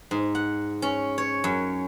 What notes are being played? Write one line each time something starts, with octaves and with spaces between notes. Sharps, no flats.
G#2
F#5
C#4
C#5
F#2